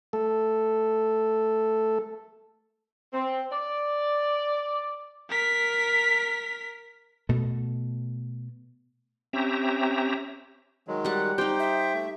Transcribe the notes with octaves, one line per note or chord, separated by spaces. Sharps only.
A3 A4
C4
D5
A#4 B6
B2 A3
C4 C#4 G4 E5 A#5
D#3 F#3 G#3
G3 F#5
D#4 G4 C5 G5
E5
A3